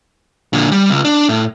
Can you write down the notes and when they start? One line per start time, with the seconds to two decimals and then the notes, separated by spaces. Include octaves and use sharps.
0.53 A#2 D3
0.72 G3
0.90 C#2
1.05 D4
1.29 A2